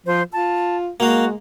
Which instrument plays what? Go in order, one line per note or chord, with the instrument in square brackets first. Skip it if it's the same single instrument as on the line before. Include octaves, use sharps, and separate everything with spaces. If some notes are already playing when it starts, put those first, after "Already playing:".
[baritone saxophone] F3 [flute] C5
[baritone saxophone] F4 [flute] A5
[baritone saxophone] G#3 [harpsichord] A#3 F5 [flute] F#4